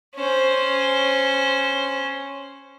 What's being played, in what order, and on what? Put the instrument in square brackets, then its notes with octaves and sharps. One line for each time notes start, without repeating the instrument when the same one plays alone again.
[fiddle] C#4 C5